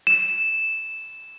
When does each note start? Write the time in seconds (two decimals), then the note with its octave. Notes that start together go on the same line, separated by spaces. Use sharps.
0.07 E7